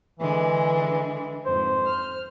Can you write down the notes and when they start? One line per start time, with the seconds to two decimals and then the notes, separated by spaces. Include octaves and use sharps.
0.20 D3 E3 G#3
1.46 F2 G#2 C5
1.86 F6